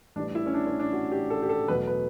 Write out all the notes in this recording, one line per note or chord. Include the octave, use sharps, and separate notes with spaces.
A1 A2 E3 G3 D4
E4
C#4
D4
C#4
D4
F#4
G4
A4
G4
A4
E2 B2 F#3 A3 B4
B4